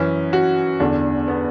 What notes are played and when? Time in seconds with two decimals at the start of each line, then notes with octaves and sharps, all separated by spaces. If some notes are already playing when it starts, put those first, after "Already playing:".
Already playing: F#2 E3 C#4
0.33 F#4
0.80 E2 D3 D4
1.28 B3